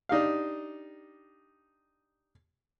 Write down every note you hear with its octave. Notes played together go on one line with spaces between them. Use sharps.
D4 D#4 G4 F5